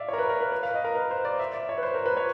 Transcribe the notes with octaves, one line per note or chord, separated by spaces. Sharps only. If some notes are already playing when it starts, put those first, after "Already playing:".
Already playing: D5 E5 F5
A#4 C#5
B4
A#4
B4
B4
F5
D#5
A#4
B4
C5
D5
E5
D5
C#5
B4
C5
A#4
B4
C#5